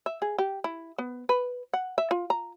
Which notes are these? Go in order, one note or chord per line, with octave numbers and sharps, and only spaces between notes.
E5
G#4
G4
E4
B3
B4
F#5
E5
F4
A#5